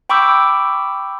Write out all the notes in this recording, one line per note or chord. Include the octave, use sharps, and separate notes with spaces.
G5 B5 C#6 D6 E6 G6